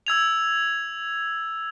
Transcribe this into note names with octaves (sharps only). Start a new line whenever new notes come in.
E6 G#6 F7